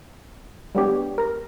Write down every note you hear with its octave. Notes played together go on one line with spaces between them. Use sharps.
G3 G#3 B3 D4 G4 C#5
A#4 A#5